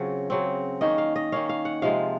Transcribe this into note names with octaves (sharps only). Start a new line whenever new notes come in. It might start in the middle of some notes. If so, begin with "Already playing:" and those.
Already playing: C#3 F#3 C4 F4
C#3 F#3 C4
D#3 A#3 C#4 D#5
F5
D#5
D#3 A#3 C#4 F5
F5
F#5
C3 F3 G#3 F5